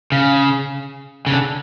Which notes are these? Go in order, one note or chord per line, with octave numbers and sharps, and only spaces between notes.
C#3
C#3
D3